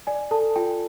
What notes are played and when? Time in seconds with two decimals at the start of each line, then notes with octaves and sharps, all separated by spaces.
0.07 D5 G#5
0.31 A4 A5
0.56 F4 G5